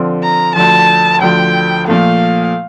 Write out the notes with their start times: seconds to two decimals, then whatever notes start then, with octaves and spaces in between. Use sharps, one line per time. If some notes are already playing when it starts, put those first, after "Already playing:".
Already playing: D3 F3 C4
0.23 A#5
0.55 D2 D3 F3 A5
1.21 D2 D3 F3 G5
1.87 A#2 F3 A3 F5